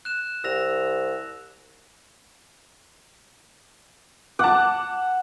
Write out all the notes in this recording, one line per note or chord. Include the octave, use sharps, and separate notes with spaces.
F#6 E7
C2 E6 A#6 F7
F#5 A5 D6